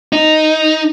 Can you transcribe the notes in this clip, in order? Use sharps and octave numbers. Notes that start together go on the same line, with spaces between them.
D#4